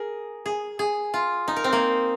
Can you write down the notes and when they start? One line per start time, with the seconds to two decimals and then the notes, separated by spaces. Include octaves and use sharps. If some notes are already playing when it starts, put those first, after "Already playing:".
Already playing: G#4 A#4
0.46 G#4
0.79 G#4
1.14 F4
1.48 D#4
1.56 A#4
1.64 C4
1.72 A#3